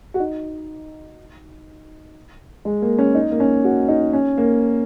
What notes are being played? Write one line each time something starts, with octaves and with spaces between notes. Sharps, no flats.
F#4
D#4
G#3
A#3
C#4
D#4
A#3
C#4
F#4
D#4
C#4
A#3